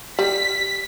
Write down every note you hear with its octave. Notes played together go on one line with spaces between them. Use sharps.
G3 B6